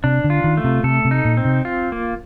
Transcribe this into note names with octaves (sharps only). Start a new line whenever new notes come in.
C3 D4
D3
F4
D#3
A3
C3
C3 A4
C3
D#4
A#2
C4
C3
F4
A#3